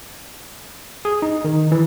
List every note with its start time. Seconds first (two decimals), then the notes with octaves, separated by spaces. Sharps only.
1.05 G#4
1.22 D#4
1.45 D#3
1.72 E3